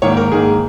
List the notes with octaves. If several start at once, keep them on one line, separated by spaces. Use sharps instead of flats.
G#2 D#3 A#3 C#5
A#4
G#2 D#3 A#3 G#4